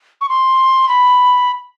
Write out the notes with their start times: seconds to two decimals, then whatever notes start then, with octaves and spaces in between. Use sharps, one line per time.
0.21 C#6
0.29 C6
0.89 B5